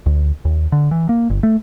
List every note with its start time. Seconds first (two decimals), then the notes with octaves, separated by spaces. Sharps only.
0.06 D2
0.45 D#2
0.72 D3
0.91 E3
1.09 A#3
1.30 G1
1.43 A3